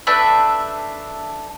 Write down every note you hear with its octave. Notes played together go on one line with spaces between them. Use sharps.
A3 D4 B4 E5